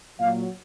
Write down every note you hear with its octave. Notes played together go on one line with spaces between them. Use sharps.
A#2 F#3 F5